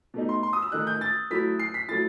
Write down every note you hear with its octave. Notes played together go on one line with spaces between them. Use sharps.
B2 A3 D#4
C6
C6
D#6
E6
D#3 A3 D#4 F#6
G6
A6
F#3 A3 E4 B6
C7
B6
F#3 A3 E4 A6